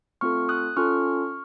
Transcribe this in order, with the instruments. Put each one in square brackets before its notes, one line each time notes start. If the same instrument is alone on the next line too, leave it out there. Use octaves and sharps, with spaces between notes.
[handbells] A3 C4 F4 A4 C#6 F6
D#6 F#6
C#4 F4 A4 C#6 F6